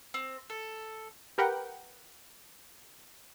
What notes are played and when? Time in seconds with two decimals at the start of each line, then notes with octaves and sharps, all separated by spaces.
0.14 C4
0.50 A4
1.38 G4 A#4 B4 F#5 G5